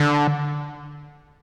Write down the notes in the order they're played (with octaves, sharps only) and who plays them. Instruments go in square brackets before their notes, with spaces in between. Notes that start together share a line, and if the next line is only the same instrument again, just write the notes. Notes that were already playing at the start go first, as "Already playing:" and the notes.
Already playing: [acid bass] D3